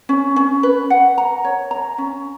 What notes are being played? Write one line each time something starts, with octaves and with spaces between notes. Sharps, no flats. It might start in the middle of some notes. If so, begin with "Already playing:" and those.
C#4
C#4
B4
F#5
A#5
C#5
A#5
C#4